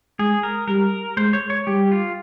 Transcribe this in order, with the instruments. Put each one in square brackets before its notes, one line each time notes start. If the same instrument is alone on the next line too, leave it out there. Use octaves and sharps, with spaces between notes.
[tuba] G#3 [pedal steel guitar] G#4
[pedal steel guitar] A#4
[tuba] G3 [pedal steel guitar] A#4
[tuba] G#3 [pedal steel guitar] C5
[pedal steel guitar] C#5
C#5
[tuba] G3 [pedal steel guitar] G4
[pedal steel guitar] F4